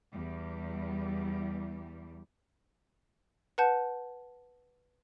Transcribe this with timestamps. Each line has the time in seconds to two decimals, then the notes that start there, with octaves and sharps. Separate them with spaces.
0.11 E2 G3
3.58 B4 F#5 A5 G6